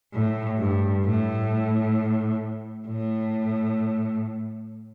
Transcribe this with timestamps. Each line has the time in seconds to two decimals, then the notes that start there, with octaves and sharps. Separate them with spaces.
0.13 A2
0.59 G2
1.05 A2
2.87 A2